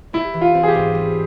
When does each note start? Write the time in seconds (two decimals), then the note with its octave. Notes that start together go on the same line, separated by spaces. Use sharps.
0.13 G3 E4
0.34 E3
0.41 F4
0.55 C4
0.63 G#4
0.68 G4
0.75 G#2
0.95 G3